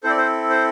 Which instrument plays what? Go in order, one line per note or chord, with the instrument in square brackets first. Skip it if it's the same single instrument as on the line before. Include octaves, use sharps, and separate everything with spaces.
[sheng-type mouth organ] C4 E4 A4 C5
D5
C5
C5